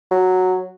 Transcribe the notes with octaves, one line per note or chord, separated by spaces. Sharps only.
F#3